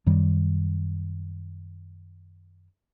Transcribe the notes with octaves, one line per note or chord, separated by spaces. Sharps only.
F#2 D#3 G3